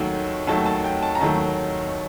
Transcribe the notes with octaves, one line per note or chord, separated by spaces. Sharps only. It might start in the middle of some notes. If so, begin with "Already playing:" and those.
Already playing: D#2 D#3 F#3 A3
D#2 D#3 F#3 A3 A5
A5
G5
A5
A#5
D#2 D#3 F#3 A3 A5